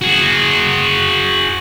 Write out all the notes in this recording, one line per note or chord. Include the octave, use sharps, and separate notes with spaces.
F#4 G#4